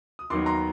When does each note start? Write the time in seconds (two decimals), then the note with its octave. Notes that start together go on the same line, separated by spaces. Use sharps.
0.19 D#6
0.30 D#2 D#3 F#3 B3 C6 D6
0.46 A#5 C6